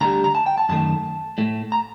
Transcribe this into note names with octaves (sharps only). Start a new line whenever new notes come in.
D2 D3 G3 A#5
A#5
A5
G5
A5
F#2 D#3 A3 A5
A2 A3
A#5